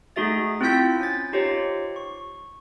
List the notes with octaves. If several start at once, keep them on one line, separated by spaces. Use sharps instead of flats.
A3 D#4 F#4 G#4 E5 A6
C4 E4 F4 E6 G6 B6
C#4 A6
D#4 F4 G4 C5 C#5
C#6